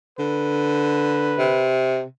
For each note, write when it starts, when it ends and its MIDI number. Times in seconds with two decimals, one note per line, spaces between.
0.19 1.56 50
0.19 1.73 71
1.38 2.04 48